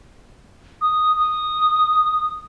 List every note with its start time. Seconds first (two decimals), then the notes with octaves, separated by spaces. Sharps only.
0.81 D#6
1.17 D#6